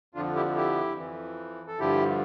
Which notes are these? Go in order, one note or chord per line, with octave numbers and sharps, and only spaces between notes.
F2 D3 F3 D4 F4
E4 G4
E4 G4
F2 E3
A4
G2 D3 F3 E4 G4